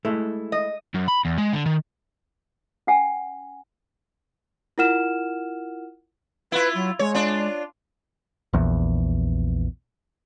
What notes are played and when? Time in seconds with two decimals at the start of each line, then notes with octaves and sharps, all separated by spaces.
0.05 G#3 A3 E4
0.52 D#5
0.94 F#2
1.08 B5
1.25 E2
1.38 G#3
1.53 D3
1.66 D#3
2.87 C#4 F#5 G#5
4.78 E4 F4 A#4 F#5 F6 E7
6.52 E4 F4 B4
6.75 F#3
6.99 G#3 C#5
7.14 D4 F4
8.53 A#1 E2